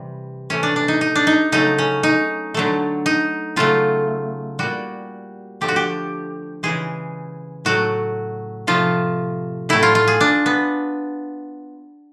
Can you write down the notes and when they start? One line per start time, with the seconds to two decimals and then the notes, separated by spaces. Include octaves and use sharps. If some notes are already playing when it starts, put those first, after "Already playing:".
Already playing: C3 E3 G3
0.50 C3 E3 A3 C#4
0.63 D4
0.76 D4
0.88 D#4
1.01 D#4
1.15 D4
1.27 D#4
1.52 C#3 F#3 A3 D#4
1.78 C#4
2.03 D#4
2.54 D3 F#3 A3
3.06 D#4
3.56 C#3 F#3 A3 F4
4.59 A#2 G3 F#4
5.61 D3 F3 A3 G4
5.68 F#4
5.76 G4
6.63 C#3 E3 G#3 G#4
7.65 A2 F#3 A3 F#4
8.67 C3 F3 A3 F4
9.69 A2 F#3 A3 E4
9.83 F4
9.95 F4
10.07 G#4
10.21 D4
10.46 B3